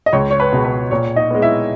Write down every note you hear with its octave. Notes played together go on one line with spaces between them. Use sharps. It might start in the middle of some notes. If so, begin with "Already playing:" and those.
D#5
C#2 C#5
C#5
B4
B2 G#3
B4
A#2 C#5
D#4 D#5
G#3 B3
E4 E5